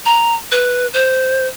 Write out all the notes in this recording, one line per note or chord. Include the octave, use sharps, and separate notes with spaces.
A#5
B4
C5